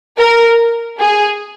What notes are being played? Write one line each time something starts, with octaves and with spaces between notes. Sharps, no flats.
A#4
G#4